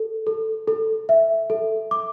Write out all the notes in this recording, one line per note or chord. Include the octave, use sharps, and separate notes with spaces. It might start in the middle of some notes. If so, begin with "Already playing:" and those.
Already playing: A4
A4
A4
E5
A4
D6